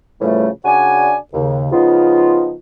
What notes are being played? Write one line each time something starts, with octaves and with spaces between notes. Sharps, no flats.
A2 C#3 E3 F3 G3 A3
C#3 D4 F#4 D5 G#5
D#2 C#3
C#3 F3 B3 D#4 F4